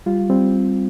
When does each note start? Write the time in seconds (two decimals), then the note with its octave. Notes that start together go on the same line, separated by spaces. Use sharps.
0.06 G3 F4
0.30 G3 C4